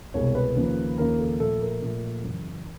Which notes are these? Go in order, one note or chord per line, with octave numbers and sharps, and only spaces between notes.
C2 B2 G#3 C#5
B4
D#2 C#3 F3 A#3
D#2 C#3 F3 A#3 A#4
A4
A#2 F3 A3 A4
A#4
A#2 F3 A3
F#2 C#3 E3